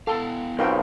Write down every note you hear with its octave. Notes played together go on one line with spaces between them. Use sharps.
B3 E4 A4 F5
B1 C4 F4 A#4 G5